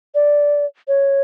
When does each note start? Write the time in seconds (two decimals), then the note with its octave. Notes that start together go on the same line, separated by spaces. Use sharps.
0.15 D5
0.88 C#5